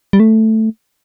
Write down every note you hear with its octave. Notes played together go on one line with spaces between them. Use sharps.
G3
A3